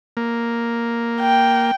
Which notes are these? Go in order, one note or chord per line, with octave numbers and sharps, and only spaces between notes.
A#3
G5